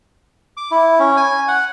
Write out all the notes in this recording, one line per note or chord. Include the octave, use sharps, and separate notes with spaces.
D6
E4
C#4
G#5
F#5